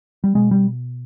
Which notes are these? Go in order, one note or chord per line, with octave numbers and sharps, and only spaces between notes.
G3
B2 G#3
G3